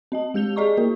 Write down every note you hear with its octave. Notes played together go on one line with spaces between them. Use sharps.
C4 D#5 A5
G#3 G4 G6 F7 G7
G#4 D5 D#5 A#5 C#6 D6
A#3 F#4 A#4